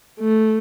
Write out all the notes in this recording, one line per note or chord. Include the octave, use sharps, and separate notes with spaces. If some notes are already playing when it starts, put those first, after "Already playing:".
A3